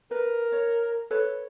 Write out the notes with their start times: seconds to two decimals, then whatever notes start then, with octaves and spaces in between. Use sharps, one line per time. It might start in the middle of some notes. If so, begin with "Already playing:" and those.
0.11 A#4 B4
0.52 C#5
1.10 A4 B4 C#5